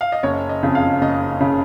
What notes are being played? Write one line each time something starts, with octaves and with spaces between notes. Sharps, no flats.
F5
D#5
F#1 C#5
D#5
F2 C#3
F5
F#1 D#5
C#3